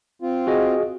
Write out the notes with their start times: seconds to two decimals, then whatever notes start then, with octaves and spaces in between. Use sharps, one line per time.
0.22 C4 F4
0.47 F#4 G#4 D#5